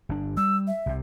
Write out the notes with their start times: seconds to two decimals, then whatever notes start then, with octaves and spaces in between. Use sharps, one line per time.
0.09 G1 D4
0.37 G3 E6
0.67 E5
0.86 C2 C3